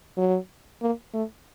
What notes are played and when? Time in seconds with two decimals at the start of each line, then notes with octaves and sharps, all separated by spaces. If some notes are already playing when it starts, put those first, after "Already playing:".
0.17 F#3
0.82 A#3
1.14 A3